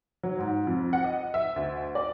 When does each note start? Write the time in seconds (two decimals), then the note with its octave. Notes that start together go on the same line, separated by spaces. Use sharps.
0.23 F#3
0.39 G#2
0.67 F2
0.93 F#5
1.04 D#5
1.34 E5
1.56 D2
1.95 D5